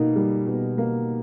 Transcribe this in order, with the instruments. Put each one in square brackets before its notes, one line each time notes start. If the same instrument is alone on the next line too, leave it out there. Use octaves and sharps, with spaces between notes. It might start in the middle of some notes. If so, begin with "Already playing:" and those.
Already playing: [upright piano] B2 A#3 D#4
G3
B2
A#3